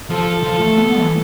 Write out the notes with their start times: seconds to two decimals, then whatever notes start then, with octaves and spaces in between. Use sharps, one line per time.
0.10 F3 A4
0.44 F3
0.60 A3
0.77 B3
1.00 E3